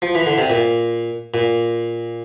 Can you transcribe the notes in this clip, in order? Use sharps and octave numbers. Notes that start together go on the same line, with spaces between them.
F3
E3
D3
C3
A#2
A#2